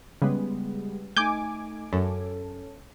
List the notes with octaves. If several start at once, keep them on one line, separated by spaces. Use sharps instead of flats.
C#3 G3 G#3 B3
A3 D#4 G#5 D6 G6
F#2 C#4 A4